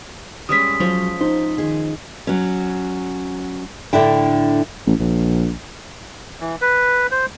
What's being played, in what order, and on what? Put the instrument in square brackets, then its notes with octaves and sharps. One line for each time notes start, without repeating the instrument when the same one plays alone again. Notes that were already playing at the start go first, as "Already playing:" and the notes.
[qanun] G3 G#3 C#4 [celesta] D#6 B6
[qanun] F3 [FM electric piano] F#3 C5
[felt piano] D#4 [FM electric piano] C5
[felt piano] D#3 [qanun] G#4
[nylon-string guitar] F#3 C#4
A2 D3 D4 E4 G5
[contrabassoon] A1
A#1
[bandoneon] E3
B4
C5